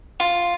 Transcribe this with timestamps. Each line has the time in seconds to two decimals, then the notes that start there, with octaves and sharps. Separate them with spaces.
0.20 F4